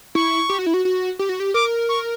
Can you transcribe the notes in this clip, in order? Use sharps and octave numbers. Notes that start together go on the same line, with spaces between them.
E4 C#6
G4
F#4
E4
F#4
F#4
G4
F#4
G4
A#4 D6
C#6